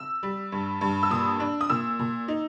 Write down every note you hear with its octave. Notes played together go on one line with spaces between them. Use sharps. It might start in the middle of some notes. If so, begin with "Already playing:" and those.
Already playing: E6
G3
G2
G2
E6
A#2 D#6
D4
D#6
A#2 E6
A#2
D#4